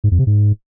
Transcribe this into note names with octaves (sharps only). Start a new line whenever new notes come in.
G#2
F2
C3
G#2